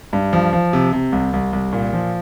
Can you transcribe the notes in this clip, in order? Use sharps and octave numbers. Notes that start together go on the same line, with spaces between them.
G2
F3
F3
C3
C3
C2
C2
C2
A#2
F3